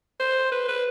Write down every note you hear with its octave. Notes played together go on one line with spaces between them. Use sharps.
C5
B4
B4